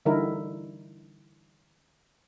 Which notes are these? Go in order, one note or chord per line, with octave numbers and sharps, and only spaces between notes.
D3 E3 G3 D#4 E4 A#4